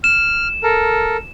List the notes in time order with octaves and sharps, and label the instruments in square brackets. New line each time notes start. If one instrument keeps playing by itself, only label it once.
[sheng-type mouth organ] F6 [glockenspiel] E7
[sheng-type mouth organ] A4 A#4